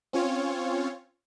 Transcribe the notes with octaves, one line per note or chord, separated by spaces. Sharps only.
C4 C#4 F4 C#5